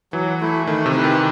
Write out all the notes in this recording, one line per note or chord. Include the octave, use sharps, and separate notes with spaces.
E3 F#3
A3 E4
D#3 A3
C3
E4 G4 B4
D#3